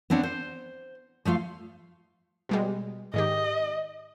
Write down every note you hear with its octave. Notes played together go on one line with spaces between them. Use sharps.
B3 C4 D4 C#5 F#5
C5
F3 A3 F4 F5
B2 G3 G#3
G#2 D#3 G4 D#5